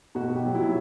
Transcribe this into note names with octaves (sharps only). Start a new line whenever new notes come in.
B2 F#4
B2
G4
F#3
E4
F#3